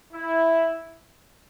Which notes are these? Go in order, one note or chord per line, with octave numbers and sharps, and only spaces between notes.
E4